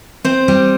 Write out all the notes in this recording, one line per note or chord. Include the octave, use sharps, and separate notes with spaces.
C4 C5
G3